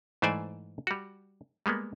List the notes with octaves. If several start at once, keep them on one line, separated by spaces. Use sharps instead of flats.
G#2 E3 A3 C5 D5 G#5
G3 F#4
G3 G#3 A#3 B3